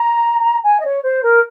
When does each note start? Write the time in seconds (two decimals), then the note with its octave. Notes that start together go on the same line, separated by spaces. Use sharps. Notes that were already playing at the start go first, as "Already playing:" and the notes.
Already playing: A#5
0.64 G#5
0.79 D#5
0.84 C#5
1.03 C5
1.22 A#4